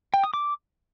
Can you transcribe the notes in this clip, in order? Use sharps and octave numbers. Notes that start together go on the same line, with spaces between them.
G5
D#6
D6